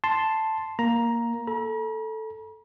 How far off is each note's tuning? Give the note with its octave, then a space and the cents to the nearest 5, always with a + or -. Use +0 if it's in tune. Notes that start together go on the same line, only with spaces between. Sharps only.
A5 +0 C6 +0
A#3 +0 A#5 +10
A4 +0 A#5 +45